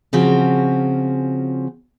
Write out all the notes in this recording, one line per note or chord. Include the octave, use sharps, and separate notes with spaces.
C#3 F3 C4 C#4 F#4